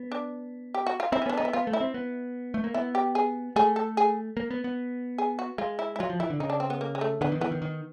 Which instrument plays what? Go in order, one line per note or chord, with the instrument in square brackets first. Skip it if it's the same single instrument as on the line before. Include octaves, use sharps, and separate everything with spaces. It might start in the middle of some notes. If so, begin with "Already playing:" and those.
Already playing: [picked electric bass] B3
[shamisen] D4
G4
F#4
F4
[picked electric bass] C4 [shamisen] E4
[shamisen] C#4
[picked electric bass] B3 [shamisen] D4
[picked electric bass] B3 [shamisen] D#4
[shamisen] E4
[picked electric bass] B3 [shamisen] F4
[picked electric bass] A3
[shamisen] E4
[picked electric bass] C4
B3
A3
A#3
[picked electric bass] B3 [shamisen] E4
[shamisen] G4
G#4
[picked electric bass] A3 [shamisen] G#4
[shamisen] A4
G#4
[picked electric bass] A#3
B3
B3
[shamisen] G#4
F#4
[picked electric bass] G#3 [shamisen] F4
[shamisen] E4
E4
[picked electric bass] F#3 [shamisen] F4
[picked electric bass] F3
[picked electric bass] E3 [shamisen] E4
[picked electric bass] D3
[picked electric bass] C#3 [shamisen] D#4
[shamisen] D4
C4
B3
A#3
G#3
A3
[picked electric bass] D3 [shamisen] B3
[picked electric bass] D#3
[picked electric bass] E3 [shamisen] B3
[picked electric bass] D#3
D#3